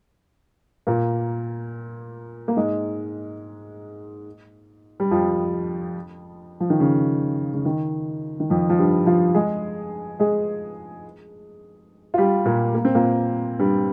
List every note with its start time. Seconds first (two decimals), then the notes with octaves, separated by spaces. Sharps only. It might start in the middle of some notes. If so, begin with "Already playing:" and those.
0.87 A#2 A#3
2.48 A#3
2.56 G#2 G#3
5.00 G3
5.11 F2 F3
6.60 F3
6.70 D#3
6.80 C#3
7.54 C#3
7.65 D#3
8.40 D#3
8.50 F2 F3
8.70 F3
8.79 G2 G3
9.06 F3 F4
9.35 G#3 G#4
10.20 G#3 G#4
12.14 F4
12.18 G3 G4
12.45 A#2 A#3
12.75 A#3
12.85 C4
12.95 A#2 A#3
13.59 G2 G3